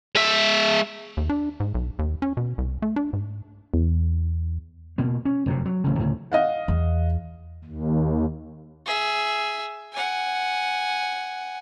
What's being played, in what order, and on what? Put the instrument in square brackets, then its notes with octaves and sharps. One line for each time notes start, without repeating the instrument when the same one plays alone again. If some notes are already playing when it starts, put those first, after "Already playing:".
[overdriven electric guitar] G#3 E5
[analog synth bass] D#2
D4
G#2
B1
D#2
C#4
B2
C2
A3
D4
G#2
[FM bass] E2
[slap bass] B2 A#3
C#4
F1 F#2 A2 C3
F#3
D1 A1 C#3
D2 A2 C#3
[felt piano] D#5 F5 F#5
[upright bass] E2
[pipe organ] D#2
[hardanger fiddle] G#4 E5
F#5 G#5